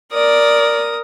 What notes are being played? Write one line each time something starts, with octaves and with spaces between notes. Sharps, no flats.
A#4 D5 D#6